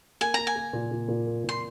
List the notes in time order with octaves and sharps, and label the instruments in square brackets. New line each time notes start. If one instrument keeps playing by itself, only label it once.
[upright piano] A#3 [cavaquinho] G#5
[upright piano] A#3 [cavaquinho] A#5
[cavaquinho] G#5
[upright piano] A#3
A#2
A#2
A#2
A#3
[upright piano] A#2 [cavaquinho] C6